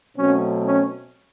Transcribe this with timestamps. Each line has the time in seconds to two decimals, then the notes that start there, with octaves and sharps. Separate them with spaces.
0.17 B2 F#3 A3 C4 C#4
0.65 C#4